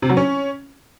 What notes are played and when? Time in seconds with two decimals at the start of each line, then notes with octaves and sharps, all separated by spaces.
0.02 C3
0.10 F#3
0.17 C#4